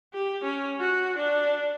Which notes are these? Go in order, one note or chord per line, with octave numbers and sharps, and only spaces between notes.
G4
C#4
F#4
D4